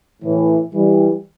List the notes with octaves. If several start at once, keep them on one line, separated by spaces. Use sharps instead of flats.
A2 E3
E3 G3